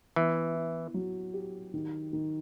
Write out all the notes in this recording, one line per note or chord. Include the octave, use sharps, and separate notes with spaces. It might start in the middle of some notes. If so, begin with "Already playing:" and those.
E3 B3
E4
F#3
G4
D#3
D#3